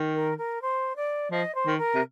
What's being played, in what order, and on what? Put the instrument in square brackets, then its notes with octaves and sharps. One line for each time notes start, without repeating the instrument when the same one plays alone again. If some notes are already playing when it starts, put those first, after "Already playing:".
Already playing: [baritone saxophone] D#3
[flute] A#4
A#4
C5
D5
[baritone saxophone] F3 [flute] D#5
[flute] C5
[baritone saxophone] D#3
[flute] A#4
[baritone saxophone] C3